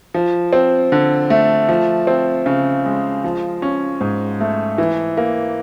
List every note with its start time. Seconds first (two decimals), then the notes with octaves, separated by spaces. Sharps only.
0.14 F3
0.53 C4
0.92 D3
1.30 A3
1.69 F3
2.07 C4
2.46 C#3
2.86 G#3
3.24 F3
3.62 C#4
4.01 G#2
4.40 A3
4.78 E3
5.17 A#3